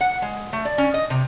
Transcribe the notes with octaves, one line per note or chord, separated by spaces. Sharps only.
F#5
G#3
A3
D5
C#4
D#5
C3